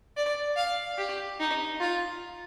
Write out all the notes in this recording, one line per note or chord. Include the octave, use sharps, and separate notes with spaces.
D5
F5
G4
D#4
F4